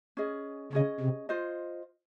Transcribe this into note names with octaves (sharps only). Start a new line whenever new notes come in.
C#4 G#4 D#5
C#3 C#4 G#4 D#5
C3
F4 C5 D#5